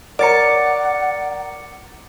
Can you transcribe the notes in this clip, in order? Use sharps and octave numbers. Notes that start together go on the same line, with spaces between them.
A#4 C#5 D5 F#5 A#5 D6 A6 C#7